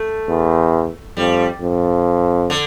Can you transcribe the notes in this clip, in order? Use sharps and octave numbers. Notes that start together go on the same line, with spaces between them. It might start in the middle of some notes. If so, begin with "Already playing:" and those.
Already playing: A3
E2
F2 G3
F2
D3